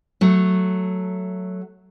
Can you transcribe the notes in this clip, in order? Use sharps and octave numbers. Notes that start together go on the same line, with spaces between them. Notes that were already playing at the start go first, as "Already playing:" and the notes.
F#3 A3